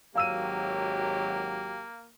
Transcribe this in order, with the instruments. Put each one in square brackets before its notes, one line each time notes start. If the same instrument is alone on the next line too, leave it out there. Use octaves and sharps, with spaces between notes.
[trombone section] G#1 F#3 [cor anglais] A#3 [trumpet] G4 [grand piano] F5 E6 D#7